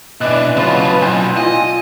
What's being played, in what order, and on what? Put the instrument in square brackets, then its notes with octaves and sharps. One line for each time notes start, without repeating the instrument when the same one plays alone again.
[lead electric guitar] B2 D4 [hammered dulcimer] E3 D5 [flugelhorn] D#5 [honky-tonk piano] F#6
[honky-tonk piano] C#3 [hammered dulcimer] F3 B3 [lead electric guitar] F#3 F4 [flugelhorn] B4
[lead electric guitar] B1 [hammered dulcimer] C4 [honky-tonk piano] D#5 G#5 [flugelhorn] F#5
[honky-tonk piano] F4 [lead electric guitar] D#5 [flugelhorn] G#5